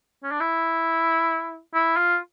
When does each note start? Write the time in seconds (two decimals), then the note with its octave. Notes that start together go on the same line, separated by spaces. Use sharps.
0.23 C#4
0.31 D4
0.40 E4
1.74 E4
1.97 F4